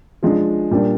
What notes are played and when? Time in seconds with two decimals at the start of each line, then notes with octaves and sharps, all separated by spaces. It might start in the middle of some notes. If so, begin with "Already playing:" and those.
0.23 F3 G#3 D4
0.71 A#2 G3 A#3 D4